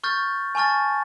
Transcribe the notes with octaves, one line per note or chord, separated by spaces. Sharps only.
C#6 F6 G6 A6
G#5 A5 C#6 F6 A6